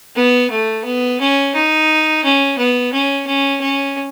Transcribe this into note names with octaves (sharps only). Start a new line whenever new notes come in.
B3
A3
B3
C#4
D#4
C#4
B3
C#4
C#4
C#4